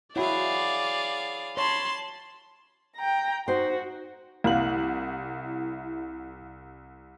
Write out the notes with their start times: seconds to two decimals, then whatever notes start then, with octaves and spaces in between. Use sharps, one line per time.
0.16 E4 F#4 G#4 C#5 D5 F5 F#5 B5
1.57 C#5 A5 B5 C6
2.96 G5 A#5
3.48 D#4 F#4 C5
4.44 C2 E4 F5 F#5 F#7